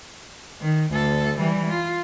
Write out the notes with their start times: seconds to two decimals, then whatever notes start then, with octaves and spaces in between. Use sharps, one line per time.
0.61 D#3
0.91 D2 A4
1.39 E3 G3
1.70 F4